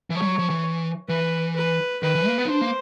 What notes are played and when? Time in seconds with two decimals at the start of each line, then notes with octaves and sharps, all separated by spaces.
0.10 E3
0.15 F3 C#5
0.22 G3
0.26 F#3
0.39 F3
0.50 E3
1.09 E3 B4
1.55 B4
2.03 D#3 B4
2.15 E3
2.27 A#3
2.38 B3
2.45 D#4
2.50 D4 C5
2.61 A#3